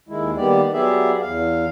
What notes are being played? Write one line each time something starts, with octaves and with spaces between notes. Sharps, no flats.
D#2 D#3 G#3 E4
D#3 G3 A#3 B3 G4 D5
F#3 B3 G4 G#4 D5 E5
E2 F5